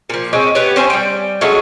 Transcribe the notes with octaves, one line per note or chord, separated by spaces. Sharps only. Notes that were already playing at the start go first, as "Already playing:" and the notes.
A#2 F3
G#3 C4 C#4
B3 G4 B4 C#5
C4 C#4 C5 G#5
G3 G5
F#3 G#3 A3 C#4